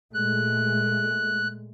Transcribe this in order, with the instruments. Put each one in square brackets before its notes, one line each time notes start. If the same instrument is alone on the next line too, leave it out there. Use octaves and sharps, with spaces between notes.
[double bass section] A#2 G#3 A3 [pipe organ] F#6